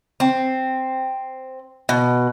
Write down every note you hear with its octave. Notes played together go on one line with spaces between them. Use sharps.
C4
B2